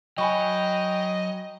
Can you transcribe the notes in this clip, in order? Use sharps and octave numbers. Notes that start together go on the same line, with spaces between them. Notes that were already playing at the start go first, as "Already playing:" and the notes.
F#3 D#5 G5 G#5 B5 C#6